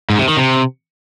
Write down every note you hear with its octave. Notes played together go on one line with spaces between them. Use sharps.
G#2
C3
D#3
C3